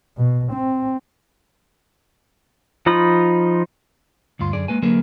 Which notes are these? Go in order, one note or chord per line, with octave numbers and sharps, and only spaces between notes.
B2
C4
F3 D#4 F4 B5 D#6
D2 G2 F4 C6
F#2 D3 G#4 D5
G#3 A#3 B4 G#5
D3 F#3 A#3 G#4 A#4 B4